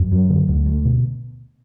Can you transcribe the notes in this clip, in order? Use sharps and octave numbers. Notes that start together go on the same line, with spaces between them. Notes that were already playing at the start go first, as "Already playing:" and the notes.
Already playing: F#2
F#3
D3
D2
A3
B2